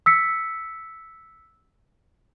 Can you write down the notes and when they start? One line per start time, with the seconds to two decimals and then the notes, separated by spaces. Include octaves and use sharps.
0.06 E6 B6 C#7